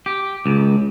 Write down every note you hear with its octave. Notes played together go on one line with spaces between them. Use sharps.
G4
C#2